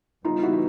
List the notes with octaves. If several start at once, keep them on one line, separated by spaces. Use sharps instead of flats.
C#3 E3 G3 B3 D#4 F4
E4 F#4